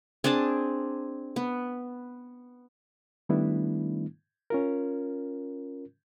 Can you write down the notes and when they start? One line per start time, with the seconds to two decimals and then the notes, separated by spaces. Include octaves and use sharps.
0.24 C4 D4 G#4 A5
1.36 B3
3.29 D#3 G3 A3 B3 D4 E4
4.50 C#4 F4 A#4